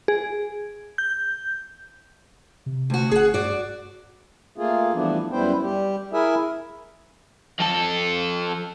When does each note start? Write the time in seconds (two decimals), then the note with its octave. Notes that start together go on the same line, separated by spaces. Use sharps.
0.08 G#4
0.98 G6
2.66 C3
2.90 D2 F#4
3.11 G1 G#4 F#5
3.34 G2 F#4 D5
4.58 A3 A#3 F4 G#4
4.94 E3 F3 G3 A3 B3 D4
5.32 F#2 G3 B3 E4 C5 G5
5.63 G3 G4
6.13 E4 G#4 A#4 E5 G#5
7.60 F2 A4